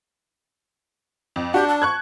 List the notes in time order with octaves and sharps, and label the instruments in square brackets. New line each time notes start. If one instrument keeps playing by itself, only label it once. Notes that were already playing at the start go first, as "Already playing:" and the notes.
[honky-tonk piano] F2
[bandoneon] D4 [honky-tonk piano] F#4 [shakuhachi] G4
[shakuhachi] A5
[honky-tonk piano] C#6 F#6 G#6